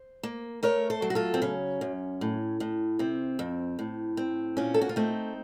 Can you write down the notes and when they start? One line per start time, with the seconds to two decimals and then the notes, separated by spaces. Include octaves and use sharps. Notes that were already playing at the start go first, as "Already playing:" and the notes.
Already playing: C5
0.23 A#3
0.63 A3 A#4 C#5
0.90 A4 C5
1.02 F#3
1.10 F#4
1.15 F4 A4
1.34 C4
1.42 C#3 C#4
1.81 F#2
2.21 A2
2.60 A2
2.99 C3 C4
3.39 F2
3.79 A2
4.17 C4
4.57 A#2 C#4
4.74 A4
4.81 F#4
4.89 F4
4.96 A3 C4 D#4